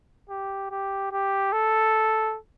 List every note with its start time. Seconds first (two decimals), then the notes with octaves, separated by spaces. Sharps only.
0.30 G4
0.71 G4
1.12 G4
1.52 A4